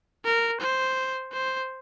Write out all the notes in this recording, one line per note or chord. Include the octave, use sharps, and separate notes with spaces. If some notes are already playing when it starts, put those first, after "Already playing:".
A#4
C5
C5